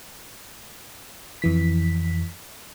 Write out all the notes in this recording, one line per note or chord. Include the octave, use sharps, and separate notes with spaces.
F2 E3 B6